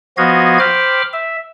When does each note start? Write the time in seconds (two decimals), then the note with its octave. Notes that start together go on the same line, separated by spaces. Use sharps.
0.18 F3 B3 F#4 D#5 F5 G#6
0.60 C5 G5 B5 D6 F6
1.13 E5